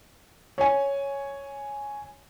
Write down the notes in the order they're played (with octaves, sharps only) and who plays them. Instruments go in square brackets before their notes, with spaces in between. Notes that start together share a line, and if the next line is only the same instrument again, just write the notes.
[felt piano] C#5 G#5